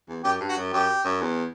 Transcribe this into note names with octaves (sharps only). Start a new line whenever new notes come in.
E2
F#2 G4
G2
F#4
F#2
F#2 G4
F#2
E2